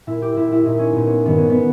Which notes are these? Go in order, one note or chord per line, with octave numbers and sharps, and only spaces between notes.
A#2 E4
G4
A#2 E4
E4
A#2 D#4
C#4
A#2 B3
C#4
G2 D#3 B3
C#4
B3